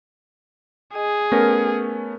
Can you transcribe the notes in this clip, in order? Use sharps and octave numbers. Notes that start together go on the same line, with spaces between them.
G#4 D#5
A3 B3 C#4 A#4 F6